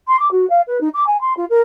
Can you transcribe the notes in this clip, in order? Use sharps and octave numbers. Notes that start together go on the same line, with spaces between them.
C6
D6
F#4
F5
B4
D#4
D6
G#5
C6
F4
A#4